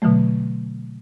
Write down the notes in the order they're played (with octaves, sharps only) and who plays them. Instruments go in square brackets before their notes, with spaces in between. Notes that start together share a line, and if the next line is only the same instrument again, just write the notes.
[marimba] B2 D3 E3 F#3 A3